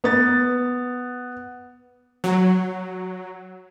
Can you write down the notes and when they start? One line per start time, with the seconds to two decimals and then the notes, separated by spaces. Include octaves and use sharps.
0.04 B3 A6
2.24 F#3